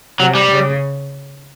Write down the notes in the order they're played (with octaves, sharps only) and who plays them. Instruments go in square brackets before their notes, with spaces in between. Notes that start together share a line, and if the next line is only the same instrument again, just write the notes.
[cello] C3 [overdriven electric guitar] F#3
[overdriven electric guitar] G3
[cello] C#3